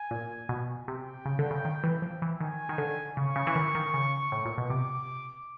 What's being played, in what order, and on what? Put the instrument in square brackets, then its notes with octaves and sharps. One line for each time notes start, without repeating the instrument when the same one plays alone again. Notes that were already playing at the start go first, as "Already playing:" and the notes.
Already playing: [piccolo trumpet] G#5
[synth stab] A#2
B2
[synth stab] C3 [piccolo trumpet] G5
[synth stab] C#3
D3
C#3
D#3
E3
F3
E3
[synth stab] D#3 [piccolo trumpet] G#5
[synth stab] D#3
D3
[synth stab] C#3 [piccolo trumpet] C#6
[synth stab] C#3
E3
D#3
D#3
C#3
A2
A#2
B2
[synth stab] C3 [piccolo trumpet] D6